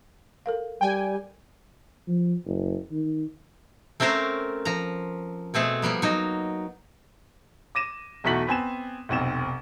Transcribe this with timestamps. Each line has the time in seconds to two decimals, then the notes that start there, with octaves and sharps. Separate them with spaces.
0.46 A4 A#4 F5
0.81 G3 G5 G#5
2.08 F3
2.45 F#1
2.92 D#3
4.00 A3 C4 C#4 A#4 C5
4.65 F3 A#5
5.54 B2 A3 C4 G#4
5.82 F3 G3 A#3 B3
6.02 F#3 D#4
7.75 D6 A#6 D#7 E7
8.24 B1 E2 A3 F#4 B6 F#7
8.47 B3 C4 G#5 E7
9.09 F1 B1 C4 E7